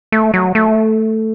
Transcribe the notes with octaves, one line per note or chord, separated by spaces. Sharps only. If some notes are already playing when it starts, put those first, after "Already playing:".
A3
F#3
A3